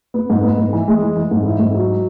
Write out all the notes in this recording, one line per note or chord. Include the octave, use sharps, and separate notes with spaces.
B3
G#2
B3
G#2
E3
G#3
E3
E3
G#2
E4
G#2
F#3